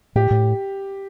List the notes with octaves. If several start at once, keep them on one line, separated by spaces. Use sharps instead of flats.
A2 G4
A2